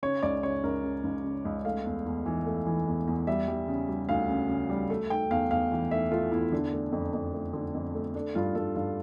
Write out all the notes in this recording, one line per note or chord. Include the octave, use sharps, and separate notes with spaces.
C#3 C#5
C#2 D5
C#3 C#5
C#2 A#4
C#3
C#2
C#3
C#2
A3 F5
E2
E2
E3
A3
E3
E2
E2
G3 E5
G3
C#3
G3
D2 F5
C#3
C#3
G3
A3
A3 G5
E2 F5
E2 F5
E3
A3 E5
A3 F4
E2 E4
D3 D4
A3
F2
F2
A3
D3
F2
A3
A3 D4
G2 F4
G2 A4
G2 F5